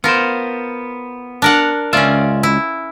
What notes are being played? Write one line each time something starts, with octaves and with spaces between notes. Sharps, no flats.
B3 F4 A#4 C5
D4 A#4 F#5
C#2 C#4 F4 D5 E5
E4